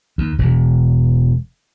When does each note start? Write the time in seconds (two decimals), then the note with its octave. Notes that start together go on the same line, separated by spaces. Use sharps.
0.18 D#2
0.38 E1